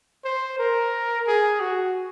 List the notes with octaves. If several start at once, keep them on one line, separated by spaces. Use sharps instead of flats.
C5
A#4
G#4
F#4